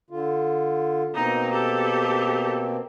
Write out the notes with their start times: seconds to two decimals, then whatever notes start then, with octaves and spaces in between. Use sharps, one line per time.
0.10 D3 F4
1.14 B2 A#3 C4 D#4
1.51 G4 A4